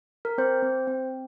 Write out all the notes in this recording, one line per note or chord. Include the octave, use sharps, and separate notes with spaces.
A#4
C4 C5
C4
C4